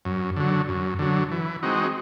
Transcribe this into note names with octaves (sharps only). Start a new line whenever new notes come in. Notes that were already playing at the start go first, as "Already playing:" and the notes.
F#2
D3 F#3
F#2
D3 F#3
E3
G#3 C4 D#4 F#4